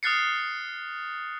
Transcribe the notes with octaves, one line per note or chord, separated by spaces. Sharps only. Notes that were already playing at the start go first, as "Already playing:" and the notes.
D#6 F6 F#6 A6 C7 C#7